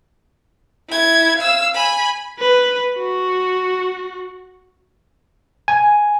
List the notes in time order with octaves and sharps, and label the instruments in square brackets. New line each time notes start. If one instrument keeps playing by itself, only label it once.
[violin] E4 G#6
F5 E6
G#5 B5
[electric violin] B4
F#4
[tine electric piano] G#5